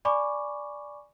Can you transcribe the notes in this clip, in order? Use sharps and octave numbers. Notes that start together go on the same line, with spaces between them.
D5 G#5 B5 C#6 D6